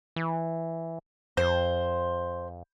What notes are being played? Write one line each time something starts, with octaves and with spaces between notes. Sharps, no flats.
E3
F2 C5